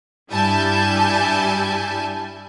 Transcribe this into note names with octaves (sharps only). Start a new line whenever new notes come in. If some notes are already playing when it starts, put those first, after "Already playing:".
G2 G3 E4 G#5 A5 G6